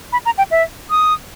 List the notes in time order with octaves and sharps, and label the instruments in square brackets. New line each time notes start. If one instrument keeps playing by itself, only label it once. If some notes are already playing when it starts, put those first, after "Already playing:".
[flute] B5
A#5
G5
E5
D#6